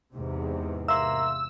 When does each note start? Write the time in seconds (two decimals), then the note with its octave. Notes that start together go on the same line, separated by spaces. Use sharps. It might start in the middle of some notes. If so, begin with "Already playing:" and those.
0.14 E2 G#2 C3
0.88 A#3 E5 F5 C6 E6